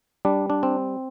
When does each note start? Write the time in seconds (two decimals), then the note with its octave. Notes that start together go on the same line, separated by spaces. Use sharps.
0.25 G3 D4
0.50 D4
0.63 C4